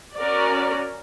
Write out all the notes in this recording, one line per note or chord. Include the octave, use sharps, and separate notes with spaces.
C#4 F#4 A#4 D5